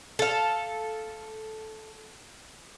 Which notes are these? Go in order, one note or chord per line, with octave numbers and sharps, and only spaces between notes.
A4 F5